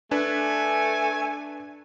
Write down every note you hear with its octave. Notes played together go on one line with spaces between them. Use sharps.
A3 D4 B4 G#5